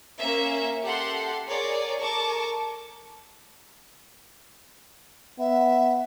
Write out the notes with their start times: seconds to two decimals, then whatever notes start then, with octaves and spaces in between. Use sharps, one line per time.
0.20 A#3 C#4 E5
0.82 G4 A4 F#5 C6
1.47 G#4 A#4 C#5 D5
1.99 A4 A#4 A5 C#6 D6
5.39 B3 E5